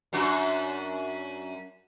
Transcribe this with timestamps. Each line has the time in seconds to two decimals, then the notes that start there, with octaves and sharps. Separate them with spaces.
0.13 F#2 D4 F#4